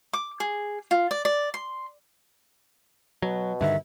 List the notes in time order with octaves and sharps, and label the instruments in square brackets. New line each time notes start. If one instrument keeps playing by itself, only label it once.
[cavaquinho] D6
G#4
F4
D5
D5
C6
[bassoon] B2 [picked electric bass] F#3
[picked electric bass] G2 D3 D#3 [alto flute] E5